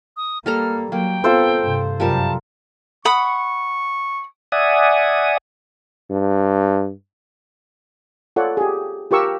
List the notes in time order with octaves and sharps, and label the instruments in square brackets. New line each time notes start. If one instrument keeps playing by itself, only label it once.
[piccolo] D#6
[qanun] G3 A4 A#5 [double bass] A#3 [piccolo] F6
[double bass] F#3 [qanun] A#3 [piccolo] G5
[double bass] B3 C4 [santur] F4 A4 C5
[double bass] G2 C3
[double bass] F#2 C3 [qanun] F3 G3 A#4 [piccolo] A5
[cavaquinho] F#5 B5 D#6 [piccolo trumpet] C#6
[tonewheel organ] D5 E5 F#5 G#5 D#6
[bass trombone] G2
[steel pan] F4 A4 C#5 D5 F#5
G4 G#4
F4 G4 A#4 C#6 E6